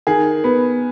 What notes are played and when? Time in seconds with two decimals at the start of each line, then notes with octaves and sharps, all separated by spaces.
0.07 D#3 G#4
0.44 B3